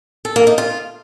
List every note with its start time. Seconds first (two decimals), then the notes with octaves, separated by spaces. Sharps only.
0.25 A4
0.36 A#3
0.47 D#4
0.58 F4